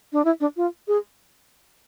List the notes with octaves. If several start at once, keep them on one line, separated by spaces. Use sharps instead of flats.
D4
E4
D4
F4
G#4